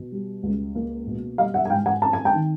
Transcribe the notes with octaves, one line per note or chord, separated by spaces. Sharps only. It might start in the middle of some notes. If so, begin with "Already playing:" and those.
Already playing: B2
G3
C#2
A#3
B2
G3 D#5 F5
E5 F#5
G#5
G#2 F5 G5
F#5 G#5
C4 A5
G#5
G5 A5
D#3